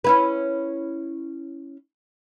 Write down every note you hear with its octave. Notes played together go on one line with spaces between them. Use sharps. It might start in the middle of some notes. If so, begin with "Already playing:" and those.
C#4 E4 B4